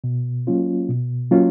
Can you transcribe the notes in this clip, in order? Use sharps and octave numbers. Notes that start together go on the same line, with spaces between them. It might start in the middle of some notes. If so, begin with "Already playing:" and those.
B2
F#3 A#3 C#4 F4
B2
F#3 A#3 C#4 F4